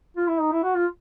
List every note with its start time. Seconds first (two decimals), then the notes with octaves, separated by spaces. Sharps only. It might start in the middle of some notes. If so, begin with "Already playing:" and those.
0.17 F4
0.28 E4
0.40 D#4
0.52 E4
0.63 F#4
0.75 F4